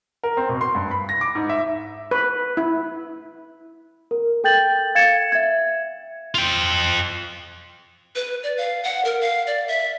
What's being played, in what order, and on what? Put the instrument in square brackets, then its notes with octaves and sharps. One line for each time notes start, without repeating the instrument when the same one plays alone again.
[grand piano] A#4
C4
B2
C6
G2
B5
A#6
D6
G#2
E5
[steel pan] B4
E4
[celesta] A#4
A4 G5 G6 A6 F#7
F5 G#6 A6 C#7 E7
E5 G#6
[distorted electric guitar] F4 G5
[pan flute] B4
D5
F5
F#5
A#4
F5
D5
E5